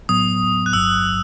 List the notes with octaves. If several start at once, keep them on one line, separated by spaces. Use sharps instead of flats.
A2 F#3 B3 D#6
F#6
G1 G2 F#3 E6